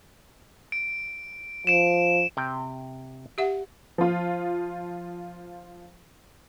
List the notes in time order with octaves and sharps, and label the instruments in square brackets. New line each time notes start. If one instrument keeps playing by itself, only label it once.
[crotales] D7
[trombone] F3 [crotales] D7 E7
[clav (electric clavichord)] C3 G5
[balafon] G4 E5 F#5
[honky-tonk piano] F3 F4